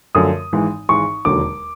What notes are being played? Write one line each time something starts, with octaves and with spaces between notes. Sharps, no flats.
F#2 D3 F3 A3 D#6
G#1 G#2 E3 G#3
G#1 G#2 E3 G#3 C#6
E1 D#2 D3 F#3 D6